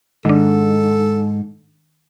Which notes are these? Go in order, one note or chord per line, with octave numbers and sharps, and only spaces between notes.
G#2 D#3 D4 A4